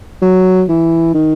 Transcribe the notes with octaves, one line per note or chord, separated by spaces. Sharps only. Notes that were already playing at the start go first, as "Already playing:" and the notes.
F#3
E3
D#3